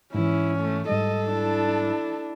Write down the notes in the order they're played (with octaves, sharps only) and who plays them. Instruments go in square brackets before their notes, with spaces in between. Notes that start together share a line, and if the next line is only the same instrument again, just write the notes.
[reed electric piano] G#2 E3 [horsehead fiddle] C#4 [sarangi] E4
[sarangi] A3
[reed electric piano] G#2 G3 [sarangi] A4 [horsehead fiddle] D#5
[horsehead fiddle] D4 E4